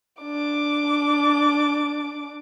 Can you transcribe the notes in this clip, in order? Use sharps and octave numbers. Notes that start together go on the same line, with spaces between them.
D4 D6